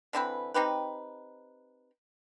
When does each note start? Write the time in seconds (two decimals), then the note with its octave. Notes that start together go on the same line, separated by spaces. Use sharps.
0.13 D3 E3 C4 B4
0.54 C4 D#4 G4 B4